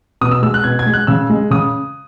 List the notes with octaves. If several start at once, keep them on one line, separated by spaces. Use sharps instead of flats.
B2 D#6
E6
G#3 E6
F#6
B2 G#6
G#6
G#3
F#6
C#3 E6
G#3
C#3 D#6